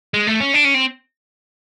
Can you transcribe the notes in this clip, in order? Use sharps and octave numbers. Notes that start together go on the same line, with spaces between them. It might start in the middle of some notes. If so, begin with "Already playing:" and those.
G#3
A3
C#4
D4
C#4
C4